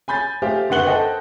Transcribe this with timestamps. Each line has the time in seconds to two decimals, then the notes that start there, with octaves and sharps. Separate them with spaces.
0.08 G#5 B5 G6 A6
0.42 A3 G4 G#4 C5 F5
0.69 F#1 D3 B3 F#5 F#7 G7
0.87 A4 C5 D#5 F#5 G5